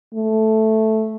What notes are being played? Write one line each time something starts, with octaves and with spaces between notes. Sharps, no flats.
A3